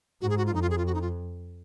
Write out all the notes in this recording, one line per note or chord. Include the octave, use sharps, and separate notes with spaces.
G#2 F#4
G#4
F#4
F4
F2 D#4
F4
G#4
F4
F#4
D#4
F4